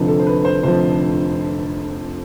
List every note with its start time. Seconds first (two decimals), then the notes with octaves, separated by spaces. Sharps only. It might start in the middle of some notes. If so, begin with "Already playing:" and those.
Already playing: F1 F2 D3 F3
0.08 A4
0.19 C5
0.27 B4
0.45 C5
0.63 F1 F2 D3 F3 C5